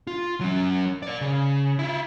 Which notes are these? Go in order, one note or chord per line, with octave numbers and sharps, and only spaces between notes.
F4
F#3 C#4
A#4 D5
C#3
E4 F4